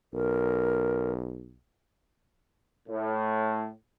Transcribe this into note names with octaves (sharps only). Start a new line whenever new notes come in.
B1 A#4
A2